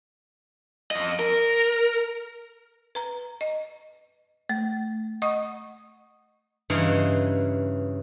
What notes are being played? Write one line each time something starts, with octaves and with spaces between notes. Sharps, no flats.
F2 D#5
A#4
B4 A#5
D#5
A3
D#5 F#5 C#6 D#6
G2 C#3 E3 D#4 F5 F#5